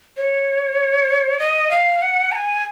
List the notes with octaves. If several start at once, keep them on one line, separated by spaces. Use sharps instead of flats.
C#5
D#5
F5
F#5
A#5
G#5